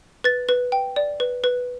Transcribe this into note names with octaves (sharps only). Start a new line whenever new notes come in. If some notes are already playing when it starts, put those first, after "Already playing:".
B4 A6
B4
G5
D5
B4
B4